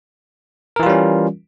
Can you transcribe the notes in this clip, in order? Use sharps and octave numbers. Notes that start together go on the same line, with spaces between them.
E3 G3 C#4 F4 A#4